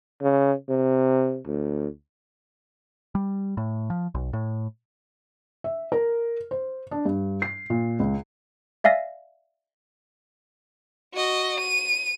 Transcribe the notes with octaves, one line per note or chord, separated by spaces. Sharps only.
C#3
C3
D2
G3
A2
F3
B1
A2
E5
A#4
C5
D4
G2
C7
A#2
C#2
D5 E5 F5 G#5 A#6
F#4 D#5
D#7